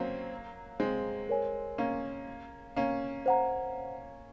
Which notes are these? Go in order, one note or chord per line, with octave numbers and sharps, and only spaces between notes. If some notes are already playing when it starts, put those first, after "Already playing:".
Already playing: F#3 A#3 C4 C#4
G#3 C4
A#4 C#5 G#5
A#3 C#4
A#3 C#4
C5 F#5 A#5